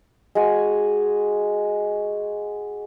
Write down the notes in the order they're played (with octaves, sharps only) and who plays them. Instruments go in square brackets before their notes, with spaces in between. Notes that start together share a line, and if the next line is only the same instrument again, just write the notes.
[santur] G#3 F#4 F5 G#5